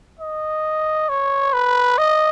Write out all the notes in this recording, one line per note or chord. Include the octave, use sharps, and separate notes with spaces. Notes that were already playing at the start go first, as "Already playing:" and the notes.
D#5
C#5
B4
D#5